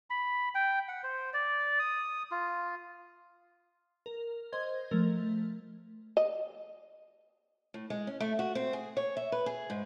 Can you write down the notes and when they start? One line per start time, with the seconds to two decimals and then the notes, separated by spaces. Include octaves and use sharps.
0.10 B5
0.55 G5
0.88 F#5
1.03 C5
1.33 D5
1.79 D#6
2.31 F4
4.06 A#4
4.52 C5 D#5 C6 G#6
4.91 F3 A3 A#4
6.17 D#5
7.74 A2
7.90 G#3
8.07 C#4
8.20 A3
8.39 F#4
8.55 C4
8.73 G#4
8.97 C#5
9.17 E5
9.32 B4
9.46 G#4
9.70 G#2